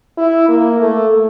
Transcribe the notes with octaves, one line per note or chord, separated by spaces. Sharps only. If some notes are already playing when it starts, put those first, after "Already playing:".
E4
A#3
A3